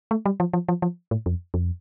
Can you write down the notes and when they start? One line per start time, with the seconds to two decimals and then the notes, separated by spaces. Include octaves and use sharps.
0.11 A3
0.26 G3
0.40 F3
0.53 F3
0.69 F3
0.82 F3
1.11 A2
1.26 F2
1.54 F2